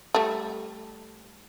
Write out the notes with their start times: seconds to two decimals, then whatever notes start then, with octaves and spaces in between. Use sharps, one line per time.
0.15 G3 A3